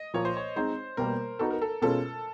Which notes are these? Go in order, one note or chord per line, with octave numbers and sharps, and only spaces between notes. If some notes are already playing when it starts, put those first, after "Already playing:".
Already playing: D#5
A#2 F3 A#3 C#5
C5
C#5
G#3 C4 D#4 C5
B2 G3 A#3 A#4
B3 D#4 F#4 A4
A#4
A4
B2 G#3 C#4 F4 A4